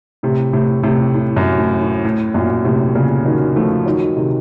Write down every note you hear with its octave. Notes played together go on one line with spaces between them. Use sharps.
A2 C3
A2 C3
A2 C3
A2
F#2
A2
A2
A2
F#2 A#2
A2 C3
A#2 C#3
D#3 F#3
F3 A3
D#3 F#3
C3 D#3